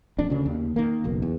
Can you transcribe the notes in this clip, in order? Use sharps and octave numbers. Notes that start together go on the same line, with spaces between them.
D#1 F2 D4
D2 C#3
D#2
D#3 A#3
F#1 B1
E2